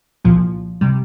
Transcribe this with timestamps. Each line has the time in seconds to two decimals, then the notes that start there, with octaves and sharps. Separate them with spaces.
0.25 C2 A#2 F3
0.81 C3 G3